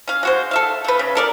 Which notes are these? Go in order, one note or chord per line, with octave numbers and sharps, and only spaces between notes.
C#4 F5
G#3 F#4 C5
A4 E5 F5
A3 B4
C#3
A4 A#4 D5